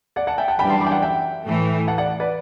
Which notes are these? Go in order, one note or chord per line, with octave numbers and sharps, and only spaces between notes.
D5 F#5
F#5 A5
E5 G5
F#5 A5
F#2 E3 G3 D4 G5 B5
A5 C6
B5 D6
G5
D5 F#5
E5 G5
A2 E3 A3
F#5 A5
D5 F#5
B4 D5